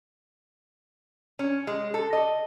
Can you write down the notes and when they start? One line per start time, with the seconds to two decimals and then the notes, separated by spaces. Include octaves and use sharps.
1.39 C#4
1.67 G#3
1.94 A4
2.13 D#5